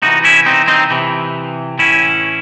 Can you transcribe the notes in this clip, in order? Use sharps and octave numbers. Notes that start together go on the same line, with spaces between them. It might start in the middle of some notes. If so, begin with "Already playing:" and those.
C3 E3 D#4 F#4
C#4 E4
C4 D#4
C4 D#4
C3 E3
A2 E3 C#4 E4